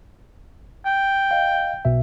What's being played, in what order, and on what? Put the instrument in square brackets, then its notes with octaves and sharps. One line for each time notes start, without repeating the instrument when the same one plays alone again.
[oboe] G5
[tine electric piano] D#5 F5
B1 B2 E5